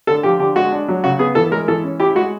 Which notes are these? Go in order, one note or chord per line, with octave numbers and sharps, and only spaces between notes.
D3 A4
F3 G4
D3 G4
G#3 F#4
D4
F#3
C#3 F#4
B3 G#4
E3 A4
G#3 A#4
E3 A4
C#4
E4 G4
G#3 F#4